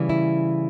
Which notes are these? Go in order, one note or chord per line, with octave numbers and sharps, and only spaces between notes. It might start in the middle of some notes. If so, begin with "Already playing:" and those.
Already playing: C#3 E3 G3
E4